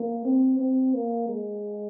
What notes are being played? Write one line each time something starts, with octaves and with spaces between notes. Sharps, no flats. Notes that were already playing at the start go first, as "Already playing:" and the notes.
Already playing: A#3
C4
C4
A#3
G#3